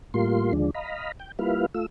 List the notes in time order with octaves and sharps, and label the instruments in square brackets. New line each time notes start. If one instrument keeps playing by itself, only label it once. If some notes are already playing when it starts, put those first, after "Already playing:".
[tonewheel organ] A2 G3 A#3 F4 C6
D#2 D3 F3 G#3 D4
D#5 F5 A#5 B5
G5
G3 A#3 E4 F4 B4 F5
A3 F4 E6